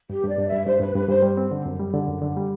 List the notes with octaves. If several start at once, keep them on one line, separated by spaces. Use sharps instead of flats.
G2 G4
G2 D5
G2
E5
G2
G2 C5
G2 B4
G2 B4
G2 C5
G3
C4
D3
F#2
G3
D3
F#2
D3
G3